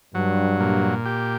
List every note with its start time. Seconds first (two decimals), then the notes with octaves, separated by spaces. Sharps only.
0.15 G2 F#3
0.60 A#2
1.05 G4